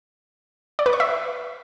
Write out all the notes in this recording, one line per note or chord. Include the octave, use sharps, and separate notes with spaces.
D5
B4
C#6
E5